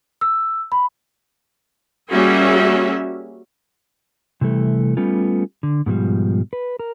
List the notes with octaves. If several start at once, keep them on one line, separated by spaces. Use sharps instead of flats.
E6
B5
G3 A#3 C#4 F#4 G#4 E5
C3 E3 G3 A3
G3 A3 B3 C#4 F4
D3
G#2 B2 F3 G3
B4
A#4